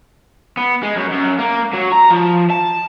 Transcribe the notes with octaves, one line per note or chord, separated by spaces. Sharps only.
B3
G#3
F#2
F#2
A#3
F#3
A#5
F3
A5